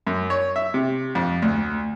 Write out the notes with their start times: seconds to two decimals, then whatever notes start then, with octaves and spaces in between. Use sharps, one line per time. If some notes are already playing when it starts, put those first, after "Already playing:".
0.07 F#2
0.30 C#5
0.56 E5
0.74 C3
1.15 F2
1.42 D2